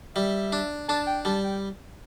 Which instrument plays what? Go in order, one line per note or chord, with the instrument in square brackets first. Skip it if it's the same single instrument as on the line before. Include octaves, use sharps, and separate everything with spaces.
[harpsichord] G3 [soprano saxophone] E5
[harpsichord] D4
[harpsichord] D4 [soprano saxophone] A5
[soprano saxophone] G5
[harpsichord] G3 [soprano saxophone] A5
[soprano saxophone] G5